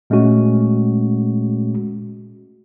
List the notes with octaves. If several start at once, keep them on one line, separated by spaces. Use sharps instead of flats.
A#2 G#3 A3 C#4 F#4